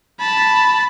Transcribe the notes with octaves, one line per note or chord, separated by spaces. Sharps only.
A5 B5